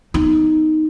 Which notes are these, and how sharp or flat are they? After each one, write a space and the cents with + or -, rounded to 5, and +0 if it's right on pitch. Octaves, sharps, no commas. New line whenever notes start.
B3 +0 D#4 +0